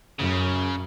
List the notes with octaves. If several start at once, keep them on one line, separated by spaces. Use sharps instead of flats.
F#2 C#3